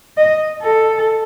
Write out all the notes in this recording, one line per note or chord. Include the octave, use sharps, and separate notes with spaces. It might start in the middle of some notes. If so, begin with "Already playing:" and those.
D#5
A4